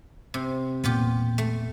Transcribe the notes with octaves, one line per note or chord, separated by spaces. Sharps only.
C3
E1 A#2 A#3 B3 F4 G4
A3